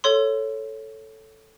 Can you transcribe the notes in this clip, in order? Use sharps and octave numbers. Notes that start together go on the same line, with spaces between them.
A4 C#5 C6